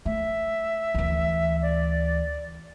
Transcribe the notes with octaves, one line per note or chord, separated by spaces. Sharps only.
A3 E5
D2 E3
D5